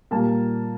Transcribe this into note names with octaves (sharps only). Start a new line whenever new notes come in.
A#2 G3 A#3 A5